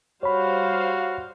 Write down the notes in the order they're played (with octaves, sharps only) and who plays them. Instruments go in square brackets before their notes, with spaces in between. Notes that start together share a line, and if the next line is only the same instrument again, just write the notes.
[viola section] G3 C5 F5 [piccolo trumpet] F#4 [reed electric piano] C#5 B5